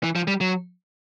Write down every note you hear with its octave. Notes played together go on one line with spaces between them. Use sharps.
E3
F3
G3
F#3